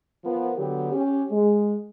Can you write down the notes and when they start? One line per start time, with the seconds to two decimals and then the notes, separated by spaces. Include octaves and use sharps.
0.24 F3 B3 A#4
0.57 D3 F#3 B3 G4
0.92 C#4 G4
1.31 G#3